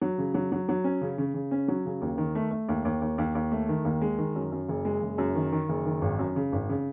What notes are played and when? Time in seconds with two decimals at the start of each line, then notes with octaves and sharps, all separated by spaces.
0.01 F#3
0.18 C#3
0.34 F#3
0.52 F#3
0.69 F#3
0.84 C#4
1.01 C#3
1.18 C#3
1.34 C#3
1.51 C#4
1.68 F#3
1.85 C#3
2.02 D#2
2.18 D#3
2.35 A3
2.51 A3
2.69 D#2
2.85 D#2
3.02 D#2
3.18 D#2
3.35 D#2
3.52 A3
3.69 D#3
3.85 D#2
4.01 G#3
4.18 D#3
4.35 F#2
4.52 F#2
4.69 F#1
4.85 G#3
5.02 F#1
5.18 F#2
5.35 D#3
5.52 D#3
5.69 F#1
5.86 D#3
6.02 G#1
6.19 F#2
6.36 C#3
6.52 G#1
6.69 C#3